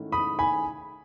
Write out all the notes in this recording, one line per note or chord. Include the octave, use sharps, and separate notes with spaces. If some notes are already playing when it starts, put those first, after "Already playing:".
Already playing: G#2 D#3 A3 C#4 E4
B5 D#6
G#5 B5